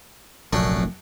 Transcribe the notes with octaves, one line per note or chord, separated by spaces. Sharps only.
F1 A#1 F#2 A3 D4